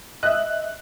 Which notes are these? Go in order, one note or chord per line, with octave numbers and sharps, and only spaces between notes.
D#5 E5 F#6